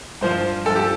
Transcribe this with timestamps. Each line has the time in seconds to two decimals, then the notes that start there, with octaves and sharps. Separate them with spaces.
0.21 G2 F3 C5
0.66 G2 F3 A4
0.76 G4